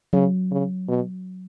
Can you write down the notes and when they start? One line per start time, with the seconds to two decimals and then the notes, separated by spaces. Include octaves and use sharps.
0.13 C#3 F#3
0.51 C#3
0.88 B2